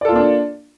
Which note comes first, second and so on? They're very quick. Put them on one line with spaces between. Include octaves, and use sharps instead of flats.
D5 A4 F4 A#3 D4